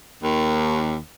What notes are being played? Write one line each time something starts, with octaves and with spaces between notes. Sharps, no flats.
D#2